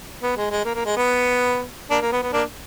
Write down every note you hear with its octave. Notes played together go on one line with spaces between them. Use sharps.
B3
G#3
G#3
A#3
A#3
G#3
B3
A#3 D4
A#3
B3
B3
A#3 D4